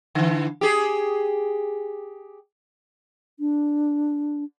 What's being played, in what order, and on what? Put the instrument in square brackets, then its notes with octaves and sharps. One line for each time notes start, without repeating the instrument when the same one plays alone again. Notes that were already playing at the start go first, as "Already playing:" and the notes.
[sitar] D3 E3
G4 G#4
[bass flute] D4